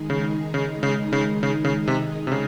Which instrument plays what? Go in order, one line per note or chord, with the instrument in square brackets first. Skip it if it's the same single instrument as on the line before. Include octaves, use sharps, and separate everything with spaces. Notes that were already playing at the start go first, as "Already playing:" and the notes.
Already playing: [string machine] D#3 G#3 D#4 G#4
[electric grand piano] C#3
C#3
C#3
C#3
C#3
C#3
C3
C3
C#3